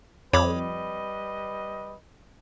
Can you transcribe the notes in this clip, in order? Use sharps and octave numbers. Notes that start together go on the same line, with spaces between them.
F2 G3 B4 C#5 D#5 B5 D6